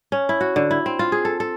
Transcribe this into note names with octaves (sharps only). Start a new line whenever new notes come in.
C#4
E4
F#4
D3
E4
C4
F4
G#4
A4
A4